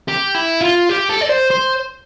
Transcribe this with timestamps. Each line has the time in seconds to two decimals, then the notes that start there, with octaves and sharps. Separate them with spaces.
0.08 G4
0.34 E4
0.61 F4
0.89 G4
1.09 A4
1.21 D5
1.29 C5
1.50 C5